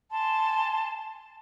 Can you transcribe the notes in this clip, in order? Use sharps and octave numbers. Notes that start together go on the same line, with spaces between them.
G#5 A5 C6